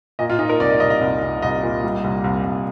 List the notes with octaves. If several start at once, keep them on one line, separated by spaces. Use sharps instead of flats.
A#2 D#5
F4
A#2 D#4
A#4
C2 D5
D#5
C2 D#5
D#5
C2
C2
C2 D#5
A#2
G3
C2
C2
C2